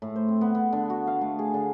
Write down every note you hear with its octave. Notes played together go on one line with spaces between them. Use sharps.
A2
C5
C4
B3
B3
D3
F#4
F5
A3
G#4
D3